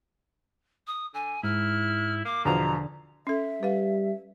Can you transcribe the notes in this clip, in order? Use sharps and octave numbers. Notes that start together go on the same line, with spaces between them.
D#6
D3 G#5
G#2 E4 F6
A#3 D6
E2 B2 D3 F3 A#5
C#4 A4 E5
G3 B4 F5